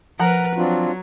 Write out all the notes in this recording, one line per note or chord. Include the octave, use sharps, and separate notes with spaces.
F3 A#4 B4 F#5 A#5
F#3 C4 D4 F4